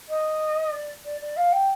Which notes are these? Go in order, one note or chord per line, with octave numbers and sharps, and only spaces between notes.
D#5
D5
D5
D5
F5
G5